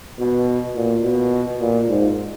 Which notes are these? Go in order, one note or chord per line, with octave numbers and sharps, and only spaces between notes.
B2
A#2
B2
A#2
G#2